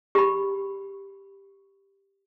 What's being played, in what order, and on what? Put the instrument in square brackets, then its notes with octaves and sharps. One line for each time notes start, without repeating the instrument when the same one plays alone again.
[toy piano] G4 B5